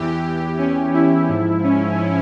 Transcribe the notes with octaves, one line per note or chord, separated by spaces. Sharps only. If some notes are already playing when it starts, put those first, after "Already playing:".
Already playing: E2 E3 G4
C#4
E4
G#2 F3 E4
C#4